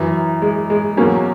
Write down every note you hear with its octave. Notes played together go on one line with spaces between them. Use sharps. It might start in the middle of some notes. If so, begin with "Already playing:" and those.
Already playing: F#2 E3
G#3
G#3
E2 B2 F#3 A#3 C#4